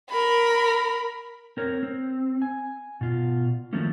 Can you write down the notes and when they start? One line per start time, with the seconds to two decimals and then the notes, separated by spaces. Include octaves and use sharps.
0.10 A#4 B5
1.57 C4 A#4 C#5
1.83 C4
2.42 G#5
3.01 B2 F4
3.73 D#3 F3 F#3 A3 A#3 C#4